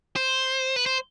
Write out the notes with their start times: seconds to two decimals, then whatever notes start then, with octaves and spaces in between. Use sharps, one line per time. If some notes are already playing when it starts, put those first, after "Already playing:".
0.16 C5
0.76 B4
0.86 C5